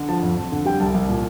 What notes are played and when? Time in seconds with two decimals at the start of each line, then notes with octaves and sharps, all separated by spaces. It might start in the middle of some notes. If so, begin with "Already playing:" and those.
Already playing: D3
0.09 F3 A5
0.23 F2
0.37 F2
0.52 D3
0.65 G3 G5
0.80 C2 A5
0.94 C2
1.09 A#2